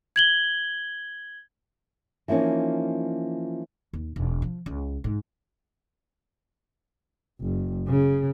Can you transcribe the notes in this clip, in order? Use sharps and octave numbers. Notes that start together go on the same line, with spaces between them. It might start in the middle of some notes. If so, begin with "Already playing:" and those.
G#6 F#7 G7
E3 F3 A#3 C#4 D#4
D#2
E1
F3
C#2
G#2
F#1
C#3